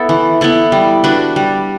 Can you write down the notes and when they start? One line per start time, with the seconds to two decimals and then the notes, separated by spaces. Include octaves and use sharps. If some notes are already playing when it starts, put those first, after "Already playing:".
Already playing: B3 E4 A4
0.09 E3
0.41 B3 E4 A4
0.72 G3
1.04 D4 F#4 B4
1.36 G3